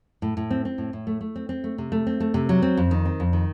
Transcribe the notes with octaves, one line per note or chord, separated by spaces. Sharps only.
A2
A2
C4
C4
A2
A2
A3
A3
C4
C4
A3
C3
A3
C4
A3
C3
F#3
C4
F2
D#3
C4
F2
D#3